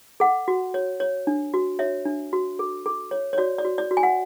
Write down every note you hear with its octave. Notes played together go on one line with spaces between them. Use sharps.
A4 F#5
F#4
C#5
C#5
D4
F#4
C#5 E5
D4
F#4
A4
A4
C#5
C#5
F#4 D5
D5
F#4
D5
F#4
G#5
F#5